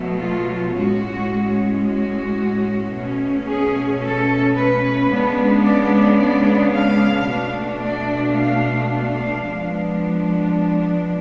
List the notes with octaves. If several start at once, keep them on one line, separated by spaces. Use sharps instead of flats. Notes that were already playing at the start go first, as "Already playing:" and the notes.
Already playing: B2 F#3 A3
F4
A2 G#3 C#4 F#4
F#4
B2 A3 C#4
G#4
A4
B4
C#3 G#3 B3 D4
D5
D5
F5
B2 A3 D4
D5
F5
F5
F3 G#3 B3 D4